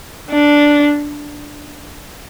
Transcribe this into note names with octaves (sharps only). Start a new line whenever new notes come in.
D4